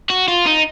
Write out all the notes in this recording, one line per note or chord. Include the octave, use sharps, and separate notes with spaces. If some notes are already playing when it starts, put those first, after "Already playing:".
F#4
F4
D#4